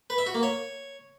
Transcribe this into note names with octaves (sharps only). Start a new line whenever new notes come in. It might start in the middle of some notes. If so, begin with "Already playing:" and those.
B4
E5
F#4
A#3
C#5